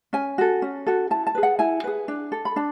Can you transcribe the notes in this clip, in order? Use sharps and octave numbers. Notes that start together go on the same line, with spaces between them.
C#4 G#5
F#4 A4
C#4
F#4 A4
E4 A5
A5
G#4 B4
F#5
E4 G#5
G#4 B4
D4
A4
B5
D4 A5